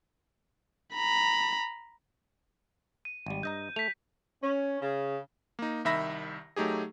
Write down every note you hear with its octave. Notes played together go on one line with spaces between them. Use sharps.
A#5 B5
D#7
G#1 G3
G2 D#5 A#5 G6
A3 B6 F7
C#4
C#3
A#3 D#4
C2 D#3 E5 B5 A#6
F#3 A3 D#4 G4 G#4